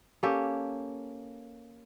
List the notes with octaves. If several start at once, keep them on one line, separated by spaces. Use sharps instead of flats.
A#3 C#4 G4 A4